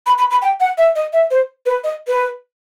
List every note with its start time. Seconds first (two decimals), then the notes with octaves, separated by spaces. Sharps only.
0.06 B5
0.18 B5
0.31 B5
0.42 G5
0.60 F#5
0.78 E5
0.96 D#5
1.13 E5
1.31 C5
1.66 B4
1.84 D#5
2.08 B4